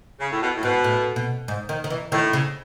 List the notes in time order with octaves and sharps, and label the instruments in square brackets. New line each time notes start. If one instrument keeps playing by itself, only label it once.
[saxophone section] C#3
A2
B2
A2
[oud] G#2 [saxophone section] B2
[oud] A2
B2
G#2
D#3
D#3
E3
[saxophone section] A2 [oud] D#3
[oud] C#3